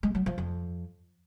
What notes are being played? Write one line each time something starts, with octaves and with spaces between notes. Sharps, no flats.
G#3
F#3
F3
F2